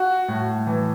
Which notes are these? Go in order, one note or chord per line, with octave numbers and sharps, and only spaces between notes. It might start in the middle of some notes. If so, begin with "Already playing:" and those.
Already playing: F#4
A2
E3